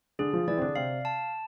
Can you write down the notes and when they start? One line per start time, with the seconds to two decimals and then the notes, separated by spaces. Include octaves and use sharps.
0.19 D3 D4 G#4
0.33 F3 F4
0.48 E3 E4 D5
0.57 C4
0.62 D3 D4
0.76 C3 C4 F5
1.05 A5